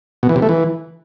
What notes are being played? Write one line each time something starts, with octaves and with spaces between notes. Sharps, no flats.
B2
E3
C3
A3
E3